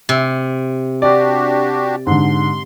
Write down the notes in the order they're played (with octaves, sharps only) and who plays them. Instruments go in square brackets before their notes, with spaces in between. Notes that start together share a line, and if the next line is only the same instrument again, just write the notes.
[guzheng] C3
[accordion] D4 F#4 G4 [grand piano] D5
[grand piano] G#2 D3 [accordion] C6